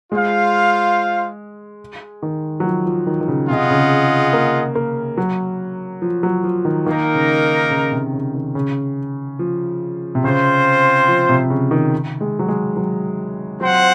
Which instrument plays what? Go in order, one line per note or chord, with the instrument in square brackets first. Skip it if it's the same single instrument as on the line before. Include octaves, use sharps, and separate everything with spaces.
[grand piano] G#3 [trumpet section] F4 C5 F5
[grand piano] D#3
F#3
F3
F3
D#3
D#3
C#3
[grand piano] C3 [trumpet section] F4 G#4 D#5 F#5
[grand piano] C#3
A#3
A#3
F#3
F3
F#3
F3
D#3
[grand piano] D#3 [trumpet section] A#3 D#4 A#4
[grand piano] C#3
C#3
C3
C#3
D#3
C#3
F3
C3
[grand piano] C#3 [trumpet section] C4 F4 C5
[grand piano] F3
C3
C#3
D#3
G#3
F#3
G#3
F#3
[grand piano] F#3 [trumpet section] C4 F4 C5 F#5